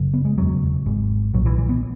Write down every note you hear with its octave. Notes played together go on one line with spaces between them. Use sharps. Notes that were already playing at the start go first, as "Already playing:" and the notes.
Already playing: F#1 F#2 C#3
B3
G#3
E1 D#2 C#3 F#3
G#1 G#2
B1 A#2 F#3
E3
E3
B3